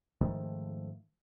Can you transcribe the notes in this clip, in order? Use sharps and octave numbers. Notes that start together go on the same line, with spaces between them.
G#2 D#3 F3 A3